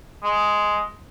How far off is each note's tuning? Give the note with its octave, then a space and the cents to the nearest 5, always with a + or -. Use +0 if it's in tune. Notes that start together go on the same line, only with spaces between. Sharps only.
G#3 +5